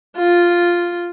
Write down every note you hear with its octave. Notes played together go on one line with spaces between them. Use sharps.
F4